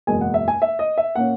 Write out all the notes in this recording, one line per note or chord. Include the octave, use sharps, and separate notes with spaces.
F#1 E2 B2 G#3 G#5
F#5
E5
G#5
E5
D#5
E5
A#2 A#3 C#4 F#5